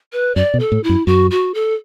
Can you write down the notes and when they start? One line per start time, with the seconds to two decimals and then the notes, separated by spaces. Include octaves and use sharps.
0.13 B4
0.36 F#2 D5
0.54 B2
0.60 A4
0.72 A2
0.84 E4
0.89 F#2
1.07 F#2 F#4
1.31 F#4
1.54 A4